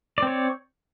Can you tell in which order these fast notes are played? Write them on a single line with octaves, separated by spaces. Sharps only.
D5 C4 C#5